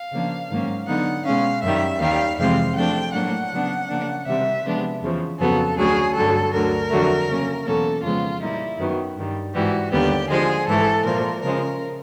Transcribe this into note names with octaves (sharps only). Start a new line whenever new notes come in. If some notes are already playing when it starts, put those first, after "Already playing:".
Already playing: F5
C#3 F3 A#3 D4
G#2 D#3 F#3 A#3 C#4
D3 F#3 B3 D#4 F#5
B2 G#3 C#4 F5
F#2 D#3 G3 E5
D#2 D#3 G3 F5
F2 C3 E3 G#3 C4 F5
C3 F3 A3 D4 G5
A2 F#3 A#3 D4 F#5
C#3 F#3 B3 D4
C#3 F3 A#3 D4
C3 D#3 G3 C4 E5
C3 F3 G#3 B3 D4
E2 C#3 F3
F2 C#3 F#3 B3 A4
D2 C#3 F#3 G#4
G2 D3 F#3 A4
D2 D3 F#3 A#4
F2 D3 F#3 A3
C#3 F#3 A#3 C#4
E2 B2 F#3 A#3 C#4 A4
F2 C#3 F3 G#3 B3 F4
A#2 G3 A#3 D#4 E4
F#2 D#3 F#3 B3
G2 D#3 G3
G#2 E3 G3 F#4
D#2 D3 G3 B3 G4
D3 F3 G#3 G#4
G#2 E3 A3 A4
A#2 F3 A3 A#4
C#3 F3 G#3 A#4